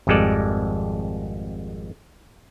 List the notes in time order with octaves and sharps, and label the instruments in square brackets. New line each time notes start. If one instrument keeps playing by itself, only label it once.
[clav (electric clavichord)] G#1 F2 G3 G#3 A4 D5